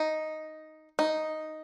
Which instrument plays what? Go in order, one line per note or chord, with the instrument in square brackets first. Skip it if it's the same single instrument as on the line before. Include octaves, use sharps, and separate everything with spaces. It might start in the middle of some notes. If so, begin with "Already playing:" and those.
Already playing: [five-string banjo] D#4
D#4